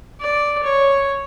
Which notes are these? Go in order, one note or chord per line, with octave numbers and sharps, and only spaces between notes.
D5
C#5